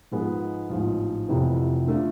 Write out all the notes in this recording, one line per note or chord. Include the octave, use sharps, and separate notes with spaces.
G#2 F3 G#3 B3
A1 G#2 F3
F1 F2 C3 E3 B3
D3 A3 D4 F4